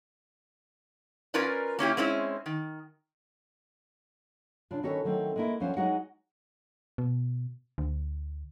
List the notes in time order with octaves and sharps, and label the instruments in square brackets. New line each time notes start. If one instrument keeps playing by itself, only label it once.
[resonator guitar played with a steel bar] C#4 F4 A#4 B4 D5
A#3 C#4 E4 G4
G#3 C4 C#4 E4
D#3
[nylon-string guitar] C#3 D4 F4
D#3 C#4 F#4 A4 B4 C#5
D#3 F#3 A3 C4
G#3 A#3 E4
D2 F3 C#4 B4 C5 F#5
F#3 G#3 D#4 F#4 F#5
[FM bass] B2
D2